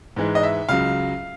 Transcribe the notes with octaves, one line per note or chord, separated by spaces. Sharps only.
G#2 E3 G#3
D#5
E5
C#2 C#3 F#3 F5